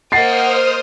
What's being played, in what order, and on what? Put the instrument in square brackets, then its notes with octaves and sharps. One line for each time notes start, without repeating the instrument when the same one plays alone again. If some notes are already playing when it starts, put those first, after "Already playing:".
[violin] A#3 D#5 [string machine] C5 D#6 F6 [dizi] F#5 [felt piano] A6 C7